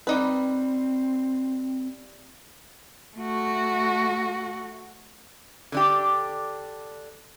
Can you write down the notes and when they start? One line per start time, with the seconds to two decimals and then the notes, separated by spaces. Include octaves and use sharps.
0.07 G3 C4 D#4 B4
3.17 A3 F#4
5.72 D3 D4 G4